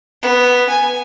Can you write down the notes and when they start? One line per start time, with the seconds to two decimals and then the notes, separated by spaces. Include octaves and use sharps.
0.22 B3
0.70 G#5